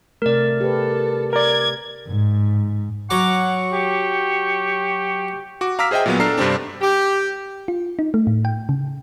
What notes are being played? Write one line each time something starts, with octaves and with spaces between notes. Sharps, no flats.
C3 A3 A#4 D5
G4 A4 B4
A#4 D5 G#6
G#2
F#3 F#5 A#5 C#6 D6
G4
F#4 D6
F5 A#5 D6 E6 F6 B6
G#4 C5 D#5 E5 G5
A#2 F#3 B3
D4 A4 A#5 F6 C7
G2 C3 C4 D4
G4
F4
D#4
A3
A2
G5
C#3